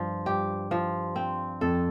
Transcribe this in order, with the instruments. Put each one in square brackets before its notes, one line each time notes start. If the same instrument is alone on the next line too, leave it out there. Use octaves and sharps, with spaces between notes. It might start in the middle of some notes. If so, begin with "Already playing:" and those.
Already playing: [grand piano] G2 [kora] F3
[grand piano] G2 [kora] G4
[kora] F3
C4
[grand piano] F2 [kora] A4